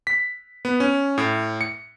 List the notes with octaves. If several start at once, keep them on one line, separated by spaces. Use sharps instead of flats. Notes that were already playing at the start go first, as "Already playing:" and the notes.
B6
B3
C#4
A2
C#7